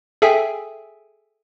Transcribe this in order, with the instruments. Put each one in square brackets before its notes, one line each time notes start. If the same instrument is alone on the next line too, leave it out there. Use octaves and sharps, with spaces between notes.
[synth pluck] G#4 A4 E5 G5 G#5